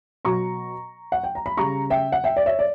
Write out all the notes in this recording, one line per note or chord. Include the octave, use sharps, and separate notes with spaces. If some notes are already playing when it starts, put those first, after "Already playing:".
B2 F#3 A#5 C#6
F#5
G5
A#5
B5
C#3 G3 A#5 C#6
E5 G5
F#5
E5 G5
D5
C#5 E5
D5